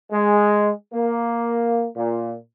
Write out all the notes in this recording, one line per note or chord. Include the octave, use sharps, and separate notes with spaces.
G#3
A#3
A#2